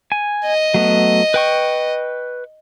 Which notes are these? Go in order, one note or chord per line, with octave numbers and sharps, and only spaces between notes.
G#5
D#5
F#3 A3 B3
B4 G5 C#6